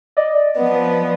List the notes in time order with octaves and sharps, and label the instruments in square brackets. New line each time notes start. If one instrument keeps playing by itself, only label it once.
[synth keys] D5 D#5
[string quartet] F3 B3